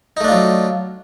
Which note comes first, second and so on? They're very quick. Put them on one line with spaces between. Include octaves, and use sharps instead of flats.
D#4 A3 D4 F4 F#3